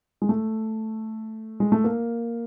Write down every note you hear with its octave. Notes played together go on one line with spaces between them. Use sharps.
G#3
A3
G#3
A3
A#3